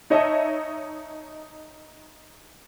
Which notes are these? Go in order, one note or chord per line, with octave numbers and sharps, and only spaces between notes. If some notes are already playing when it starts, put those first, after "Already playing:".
D#4 C#5 D#5 E5 A5